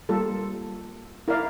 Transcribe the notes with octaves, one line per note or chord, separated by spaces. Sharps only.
G3 A#3 F4 A4
E4 A#4 D5 F5